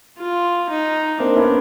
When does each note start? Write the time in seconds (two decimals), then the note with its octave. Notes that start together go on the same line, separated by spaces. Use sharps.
0.19 F4
0.69 D#4
1.19 A#3 C4 D4
1.36 B3 C#4